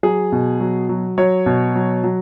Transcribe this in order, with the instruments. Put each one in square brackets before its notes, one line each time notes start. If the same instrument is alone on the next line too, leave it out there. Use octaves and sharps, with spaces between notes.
[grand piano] F#3 G#4
B2
F#3
F#3
F#3 C#5
B2
F#3
F#3